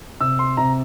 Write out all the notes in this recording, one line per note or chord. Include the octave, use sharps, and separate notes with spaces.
C3 E6
C6
C3 A#5